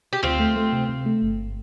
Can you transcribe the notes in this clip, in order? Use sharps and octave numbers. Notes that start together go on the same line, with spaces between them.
G4
D2 C4 F4
A3
A3
C3
C3
A3
G1